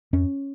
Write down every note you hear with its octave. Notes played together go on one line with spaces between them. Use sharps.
F2 C#4